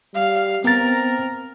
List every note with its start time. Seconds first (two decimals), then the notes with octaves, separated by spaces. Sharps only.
0.14 G3 F5
0.64 B3 C4 A#4 A6